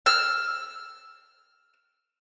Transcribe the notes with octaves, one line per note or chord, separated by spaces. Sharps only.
E6 F6